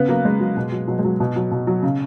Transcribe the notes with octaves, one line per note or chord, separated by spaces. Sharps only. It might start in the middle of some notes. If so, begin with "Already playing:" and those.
Already playing: C#3 B3
F#3 A#3
C#3 G#3
F#3
B2
F#3
B2 F#3
G#3
F#3
B2
F#3
B2
F#3
C#3